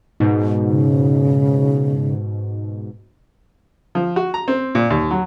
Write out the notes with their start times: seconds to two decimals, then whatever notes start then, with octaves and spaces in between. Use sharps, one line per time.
0.20 G#2 B2
0.67 C#3
3.95 F3
4.16 F#4
4.34 A#5
4.48 C4
4.75 A#2
4.90 D#2
5.11 F#3